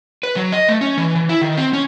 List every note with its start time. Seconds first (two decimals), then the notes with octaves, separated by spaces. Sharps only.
0.23 B4
0.36 F#3
0.52 D#5
0.69 A3
0.81 C#4
0.97 E3
1.16 E3
1.29 E4
1.42 D#3
1.57 C4
1.73 C#4